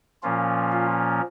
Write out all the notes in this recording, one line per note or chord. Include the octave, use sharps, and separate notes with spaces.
A#2 F3 A#3 C#4 F4
F4